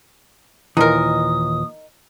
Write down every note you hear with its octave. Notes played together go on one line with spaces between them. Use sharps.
D#2 A#2 E3 D#4 A#4 D#6